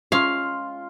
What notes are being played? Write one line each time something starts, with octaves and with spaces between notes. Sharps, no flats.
G#3 C#4 F4 F5 A#5